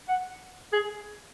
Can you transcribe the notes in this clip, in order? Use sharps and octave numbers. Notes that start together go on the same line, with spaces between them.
F#5
G#4